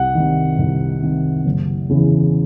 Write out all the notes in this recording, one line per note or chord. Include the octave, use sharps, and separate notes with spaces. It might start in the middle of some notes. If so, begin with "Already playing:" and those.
Already playing: C2 F#5
C3 D#3
C2
C3 D#3
F#1
E2 C#3 E3